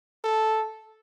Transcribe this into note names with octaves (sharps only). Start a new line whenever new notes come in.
A4